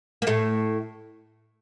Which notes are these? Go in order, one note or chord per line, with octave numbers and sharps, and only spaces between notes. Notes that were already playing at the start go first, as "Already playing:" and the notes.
A#3
A2 A3